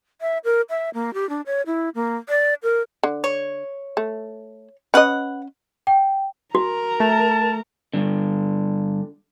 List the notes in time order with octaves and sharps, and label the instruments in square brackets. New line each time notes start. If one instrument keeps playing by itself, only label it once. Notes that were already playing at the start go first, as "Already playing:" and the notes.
[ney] E5
A#4
E5
A#3
G4
D4
C#5
E4
A#3
D5
A#4
[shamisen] D3
[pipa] C#5
[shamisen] A3
[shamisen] C#4 D#5 [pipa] B4 F#5
[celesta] G5
[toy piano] F#4 [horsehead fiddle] A#4 A#5
[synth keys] A3 [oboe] A5
[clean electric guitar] G2 D3